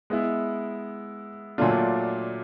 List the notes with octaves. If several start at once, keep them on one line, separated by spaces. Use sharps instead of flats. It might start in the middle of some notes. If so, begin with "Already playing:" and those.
G#3 B3 E4
A#2 F#3 A3 D4 F4